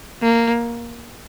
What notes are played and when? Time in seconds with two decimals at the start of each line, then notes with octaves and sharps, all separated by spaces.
0.23 A#3